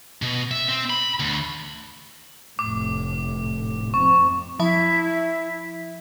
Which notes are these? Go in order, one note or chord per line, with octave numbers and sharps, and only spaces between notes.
B2
E5
C4
B5
D2
F1 A2 D6
F2 C4 C#6
F3 E4 E5 B5